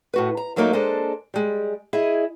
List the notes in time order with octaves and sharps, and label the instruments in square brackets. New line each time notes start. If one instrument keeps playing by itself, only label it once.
[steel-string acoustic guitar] A2 F#4 B4
A#5
F#2 F#3 A3 A#3 C4 D#4
G#3 A#3 D4 A4 C5
G3 G#3
E4 G#4 D#5